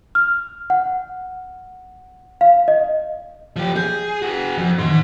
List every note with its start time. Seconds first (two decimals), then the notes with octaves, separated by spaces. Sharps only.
0.15 F6
0.70 F#5
2.41 F5
2.68 D#5
3.56 F3 G4
3.76 G#4 G6
4.22 F#4 G#4
4.58 F2
4.78 A2 D#3 E3 D#4 C6